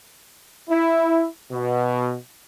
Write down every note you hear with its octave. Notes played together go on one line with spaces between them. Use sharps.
E4
B2